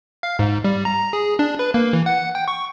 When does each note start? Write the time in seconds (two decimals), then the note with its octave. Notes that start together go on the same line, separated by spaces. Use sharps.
0.23 F5
0.39 G#2
0.64 G3
0.85 A#5
1.13 G#4
1.39 D4
1.59 B4
1.74 A#3
1.93 E3
2.06 F#5
2.35 G5
2.48 C#6